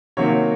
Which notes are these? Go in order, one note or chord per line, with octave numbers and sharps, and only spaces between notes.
C3 D#3 F#3 A#3 C#5